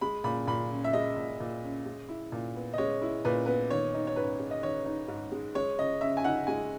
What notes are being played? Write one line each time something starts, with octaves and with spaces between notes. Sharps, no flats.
G#3 B5
A#2 B5
A#2 B5
C#4
E5
G#3 D#5
A#2
A#2
C#4
G#3
E4
A#2
B3
D#5
G#3 C#5
E4
A#2 B4
B3 B4
D#3 C#5
D#4
C#5
G#2 B4
G#3
D#5
D#3 C#5
D#4
G#2
G#3
G#3 C#5
C#3 D#5
C#3 E5
G#5
D#4 F#5
G#3 G#5